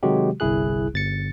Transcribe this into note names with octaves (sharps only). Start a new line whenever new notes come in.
C3 D#3 F#3 G#3 F#4 G4
G1 C2 E4 G#4 F#6
G1 A6 C#7